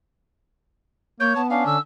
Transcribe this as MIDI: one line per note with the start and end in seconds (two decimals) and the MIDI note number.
1.20 1.34 58
1.20 1.42 73
1.20 1.33 91
1.36 1.65 59
1.36 1.47 81
1.50 1.78 61
1.50 1.78 62
1.50 1.66 77
1.67 1.78 50
1.67 1.80 88